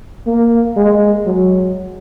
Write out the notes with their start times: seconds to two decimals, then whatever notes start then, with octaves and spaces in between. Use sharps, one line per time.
0.27 A#3
0.76 G#3
1.26 F#3